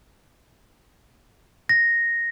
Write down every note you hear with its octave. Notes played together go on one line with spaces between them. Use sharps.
A#6